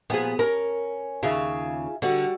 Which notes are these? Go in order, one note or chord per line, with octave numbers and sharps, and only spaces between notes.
A#2 F3 B3 G#4
C#4 A#4
D#2 C#3 F4 G#4 E5
D3 G3 F#4 F#5